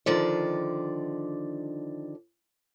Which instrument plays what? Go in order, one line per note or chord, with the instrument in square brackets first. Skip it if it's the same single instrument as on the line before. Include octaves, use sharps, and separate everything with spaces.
[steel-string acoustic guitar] D3 D#3 F3 D5